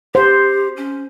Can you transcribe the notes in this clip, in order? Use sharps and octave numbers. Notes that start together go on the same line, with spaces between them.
G4 C5
C#4